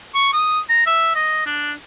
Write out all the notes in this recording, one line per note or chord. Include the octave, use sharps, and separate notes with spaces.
C#6
D#6
A#5
E5
D#5
D4